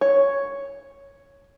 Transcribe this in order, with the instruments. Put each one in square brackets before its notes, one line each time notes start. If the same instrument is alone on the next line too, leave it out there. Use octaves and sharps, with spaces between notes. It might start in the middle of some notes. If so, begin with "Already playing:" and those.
[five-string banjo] C#5